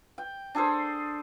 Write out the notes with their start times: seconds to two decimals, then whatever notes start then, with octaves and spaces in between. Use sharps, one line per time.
0.18 G5
0.55 D4 G#4 A4 C5